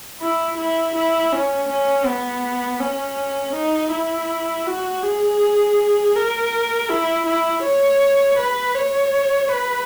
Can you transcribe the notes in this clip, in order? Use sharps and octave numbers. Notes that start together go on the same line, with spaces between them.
E4
E4
E4
C#4
C#4
B3
C#4
D#4
E4
F#4
G#4
A#4
E4
E4
C#5
B4
C#5
B4